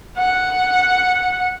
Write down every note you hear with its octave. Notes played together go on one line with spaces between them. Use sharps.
F#5